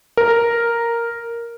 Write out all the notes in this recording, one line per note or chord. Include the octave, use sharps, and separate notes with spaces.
A#4